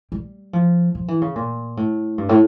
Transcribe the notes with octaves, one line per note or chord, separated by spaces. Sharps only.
G3
F3
F3
E3
C#3
A#2
A2
G2
A2